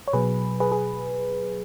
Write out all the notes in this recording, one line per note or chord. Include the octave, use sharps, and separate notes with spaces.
C#5
B2 F#3 G#4 B4
G#4 B4
G#4